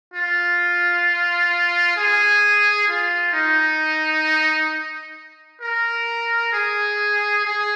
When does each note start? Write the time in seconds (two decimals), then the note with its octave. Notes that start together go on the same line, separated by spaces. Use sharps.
0.14 F4
1.96 G#4
2.88 F4
3.33 D#4
5.61 A#4
6.52 G#4
7.45 G#4